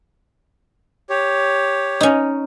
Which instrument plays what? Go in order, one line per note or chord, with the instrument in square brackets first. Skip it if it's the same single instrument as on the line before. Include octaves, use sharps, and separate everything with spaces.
[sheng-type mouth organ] G4 C#5
[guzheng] C#4 D#4